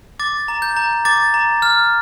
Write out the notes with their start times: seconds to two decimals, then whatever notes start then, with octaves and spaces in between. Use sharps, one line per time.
0.19 D6 A6
0.48 A#5
0.62 G6
0.77 A#5
1.05 D6 A6
1.34 A#5
1.62 F6